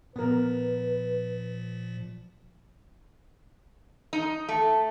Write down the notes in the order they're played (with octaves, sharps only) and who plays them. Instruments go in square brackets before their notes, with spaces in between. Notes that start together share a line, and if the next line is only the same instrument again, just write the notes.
[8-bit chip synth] A#2 F3 [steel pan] B3 A#4 [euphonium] B4
[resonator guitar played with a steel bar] D#4
A3